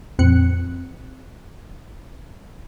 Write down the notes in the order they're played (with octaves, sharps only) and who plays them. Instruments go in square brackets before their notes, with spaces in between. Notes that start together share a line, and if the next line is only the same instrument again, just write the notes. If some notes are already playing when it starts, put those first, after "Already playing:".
[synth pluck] A#1 F2 C4 F#6 C#7